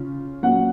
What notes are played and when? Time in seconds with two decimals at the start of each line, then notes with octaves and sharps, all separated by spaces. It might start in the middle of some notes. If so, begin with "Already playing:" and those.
Already playing: C#3 C#4 F4
0.43 A#2 F#3 C#4 F#5